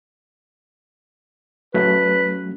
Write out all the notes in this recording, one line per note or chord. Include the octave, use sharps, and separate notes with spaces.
F#3 A3 C#4 B4